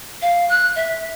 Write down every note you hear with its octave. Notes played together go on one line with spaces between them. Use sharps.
F5
F#6
E5